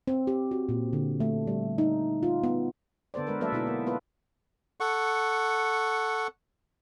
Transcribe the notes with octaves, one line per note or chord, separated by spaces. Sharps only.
C4
G4
F#4
A#2
D3
A3
G3
D#4
F4
B3
D3 B3 A4 C5 D5
G#3 A#4 B4
F#3 A#3 A4 B4 D5 E5
B2 B3 D#4 E4 A4
A#3
B3 F4 A4 B4
A4 F#5 C#6